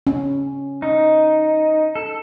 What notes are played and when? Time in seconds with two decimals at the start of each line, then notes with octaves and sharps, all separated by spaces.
0.07 C#4
0.82 D#4
1.95 A4